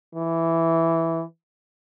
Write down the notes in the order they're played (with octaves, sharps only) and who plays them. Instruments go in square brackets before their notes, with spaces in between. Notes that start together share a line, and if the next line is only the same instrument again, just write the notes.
[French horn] E3